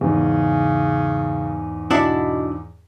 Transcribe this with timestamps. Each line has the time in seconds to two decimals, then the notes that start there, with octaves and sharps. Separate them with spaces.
0.01 E2 G#2 C#3
1.91 B2 D4 E4 F#5